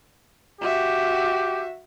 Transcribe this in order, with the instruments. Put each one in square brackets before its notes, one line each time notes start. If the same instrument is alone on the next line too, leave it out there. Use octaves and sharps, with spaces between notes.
[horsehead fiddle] F#4 E5 [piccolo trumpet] G4